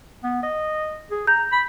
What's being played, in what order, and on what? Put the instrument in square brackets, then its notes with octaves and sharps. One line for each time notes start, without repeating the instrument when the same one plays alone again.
[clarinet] B3
D#5
G#4
[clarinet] A#5 [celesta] G6
[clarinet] B5